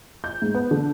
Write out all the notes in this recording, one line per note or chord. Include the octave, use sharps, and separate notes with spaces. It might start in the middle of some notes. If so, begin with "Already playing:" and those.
G6
G#2
B3
D3